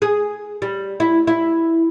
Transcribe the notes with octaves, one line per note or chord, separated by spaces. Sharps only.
G#4
G3
E4
E4